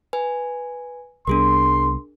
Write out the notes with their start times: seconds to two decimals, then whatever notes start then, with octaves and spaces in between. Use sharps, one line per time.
0.13 B4 G#5
1.27 C2 G3 B3 D4 G#4 A#4 C6